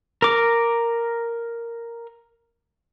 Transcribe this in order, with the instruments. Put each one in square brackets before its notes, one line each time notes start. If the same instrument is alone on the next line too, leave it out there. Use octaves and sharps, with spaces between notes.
[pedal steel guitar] A#4 D6